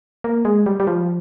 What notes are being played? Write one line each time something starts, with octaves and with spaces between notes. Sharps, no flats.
A#3
G#3
G3
G3
F3